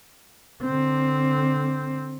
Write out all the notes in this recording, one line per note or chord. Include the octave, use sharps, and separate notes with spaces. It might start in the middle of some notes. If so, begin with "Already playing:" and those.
D3 C4